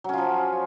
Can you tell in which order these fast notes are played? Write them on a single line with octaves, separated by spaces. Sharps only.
F#3 C#4 F4 F3